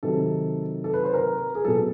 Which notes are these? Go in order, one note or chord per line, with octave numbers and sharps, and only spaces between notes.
C3 D#3 F#3 A4
A4
B4
C5
A#4
G#4
B2 F#3 A4